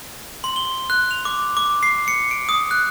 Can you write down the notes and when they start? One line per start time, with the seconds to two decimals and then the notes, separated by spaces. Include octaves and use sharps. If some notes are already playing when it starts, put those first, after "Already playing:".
0.44 C6
0.56 G7
0.90 F#6
1.11 F7
1.25 D6
1.57 D6
1.83 C7
2.08 C#7
2.31 D7
2.49 D#6
2.71 F#6